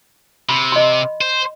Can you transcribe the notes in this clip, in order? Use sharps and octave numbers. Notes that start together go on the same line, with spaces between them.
C3 B5
D#5 C6
C5